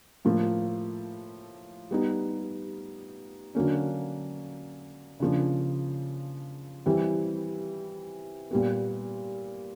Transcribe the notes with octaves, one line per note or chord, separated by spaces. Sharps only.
A2 F3 A#3
G3 B3 D#4
D3 F#3 A#3 C#4
C#3 F3 A#3 D4
E3 G3 C4
A#2 G3 B3